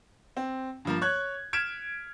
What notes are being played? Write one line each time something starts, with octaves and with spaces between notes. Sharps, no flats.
C4
G2 F3 A#3
C#5 F#6 G#6
F6 G#6 B6 D7 E7